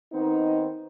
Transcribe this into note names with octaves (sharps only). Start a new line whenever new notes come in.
D#3 B3 C4 D#4